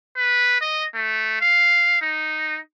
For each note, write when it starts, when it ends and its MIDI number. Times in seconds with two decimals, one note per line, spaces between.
0.17 0.56 71
0.61 0.84 75
0.95 1.37 57
1.41 2.00 77
2.02 2.59 63